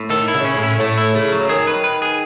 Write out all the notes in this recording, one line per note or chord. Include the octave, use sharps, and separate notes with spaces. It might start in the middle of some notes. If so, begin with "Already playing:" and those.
Already playing: A2
D#3 A4
E4
C#3
C#4
A2
E4
A2 A3
E4
C#3 A3
F#3
D#3 G#4
B4
B4
G#4